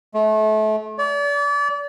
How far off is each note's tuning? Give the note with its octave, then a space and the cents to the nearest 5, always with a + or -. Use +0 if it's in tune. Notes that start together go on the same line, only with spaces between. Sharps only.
A3 -30
D5 -35